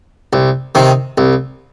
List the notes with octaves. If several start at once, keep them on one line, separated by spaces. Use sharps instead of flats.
C2
C3 D#3
C2